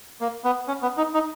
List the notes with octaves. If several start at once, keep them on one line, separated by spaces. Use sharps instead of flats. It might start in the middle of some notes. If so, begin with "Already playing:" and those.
A#3
B3
C#4
B3
D#4
D#4